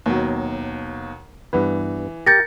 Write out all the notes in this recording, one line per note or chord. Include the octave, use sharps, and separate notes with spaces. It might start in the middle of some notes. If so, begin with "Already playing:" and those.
D#2 B2 F#3
G2 E3 B3 B4
G4 A#4 G6 A6 A#6 C#7